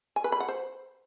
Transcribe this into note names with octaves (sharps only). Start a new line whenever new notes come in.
G#5
B4
B5
F#5
C5